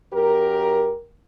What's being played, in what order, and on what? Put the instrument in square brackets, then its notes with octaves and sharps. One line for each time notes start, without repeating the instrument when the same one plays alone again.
[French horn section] F#2 G4 A#4